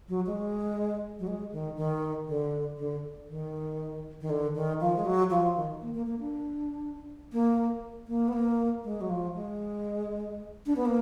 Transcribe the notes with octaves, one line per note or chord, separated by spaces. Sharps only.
F#3
G#3
F#3
G#3
D#3
D#3
D3
D3
D#3
D#3
D3
D#3
F3
G#3
F#3
F3
D#3
A#3
A#3
A#3
D4
A#3
A#3
B3
A#3
G#3
F#3
F3
G#3
D4
B3
A#3